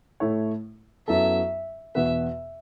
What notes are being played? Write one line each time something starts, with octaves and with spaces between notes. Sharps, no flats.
A2 A3 E4 C#5
F#2 F#3 B3 E4 A4 E5
E2 B2 B3 F#4 B4 E5